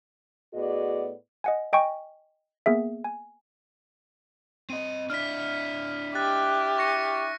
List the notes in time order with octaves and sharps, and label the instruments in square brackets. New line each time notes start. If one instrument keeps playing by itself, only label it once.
[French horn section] A2 B3 F#4 G#4 D5 D#5
[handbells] D#5 F#5 G#5
D#5 G5 G#5 C#6
A#3 B3 G#4 E5
G#5
[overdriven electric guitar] C4 D#5 [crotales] D#7
[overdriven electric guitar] D4 E4 [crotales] F6 B6
[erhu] G4 [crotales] F#6 A6
[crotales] C#6 A#6 C#7